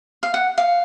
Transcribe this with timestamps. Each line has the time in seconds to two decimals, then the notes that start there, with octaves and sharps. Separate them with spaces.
0.23 F5
0.34 F#5
0.58 F5